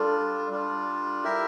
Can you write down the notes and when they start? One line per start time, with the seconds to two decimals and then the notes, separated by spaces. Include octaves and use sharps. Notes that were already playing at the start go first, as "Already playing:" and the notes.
Already playing: G3 D4 F4 A4
0.51 G3 D4 F4
1.23 E4 G4 A#4 E5